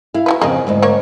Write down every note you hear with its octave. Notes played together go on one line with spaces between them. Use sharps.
E4 F5
F#3 A3 B4
F2 C#3 G#4 A#4 D#5
D2 G#2 B3
A#3 C#5